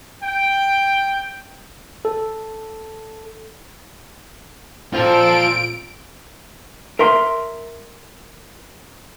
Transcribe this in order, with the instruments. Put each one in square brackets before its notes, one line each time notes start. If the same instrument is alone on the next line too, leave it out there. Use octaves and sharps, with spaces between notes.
[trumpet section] G5
[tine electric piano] A4
[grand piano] A#2 C4 [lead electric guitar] F4 C5 [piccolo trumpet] A4 [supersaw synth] D7
[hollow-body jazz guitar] A#4 E5 C6